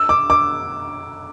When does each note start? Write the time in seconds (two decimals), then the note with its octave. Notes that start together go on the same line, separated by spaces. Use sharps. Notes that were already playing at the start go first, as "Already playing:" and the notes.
Already playing: E6
0.09 D6
0.30 D6